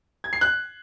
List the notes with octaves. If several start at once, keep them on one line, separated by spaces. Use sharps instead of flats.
G#6
C7
F#6